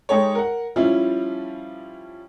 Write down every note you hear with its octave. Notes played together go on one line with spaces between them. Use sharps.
G#3 D#4 G4 A4 C#5
A#4 F#5
F3 G3 C#4 E4 F4